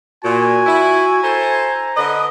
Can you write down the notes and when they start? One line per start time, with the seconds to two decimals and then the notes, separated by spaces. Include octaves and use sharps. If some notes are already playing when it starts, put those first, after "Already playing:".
0.24 A#2 F#4 G#5
0.66 E4
1.23 E4 A4 C5 A#5
1.96 D3 B4 D#5